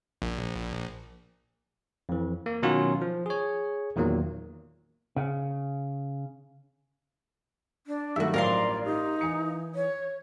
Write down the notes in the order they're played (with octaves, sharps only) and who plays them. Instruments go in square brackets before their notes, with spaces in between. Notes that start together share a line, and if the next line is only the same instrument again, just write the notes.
[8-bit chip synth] A#1
[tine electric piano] F2 E3
A#3
B2 D#3 F#3 C#4 F4 F#4
F3
G#4 C#5
E2 A#2 D#3 F#3 A#3
[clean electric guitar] C#3
[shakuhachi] D4
[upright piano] G2 D#3 A3 [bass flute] F#3 [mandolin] E4 F#4
[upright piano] A1 G2 F3 [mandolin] A#4 F5 C6 [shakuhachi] D5
[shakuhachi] D#4 [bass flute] G4
[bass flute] E3 [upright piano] G#5 C#7
[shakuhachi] C#5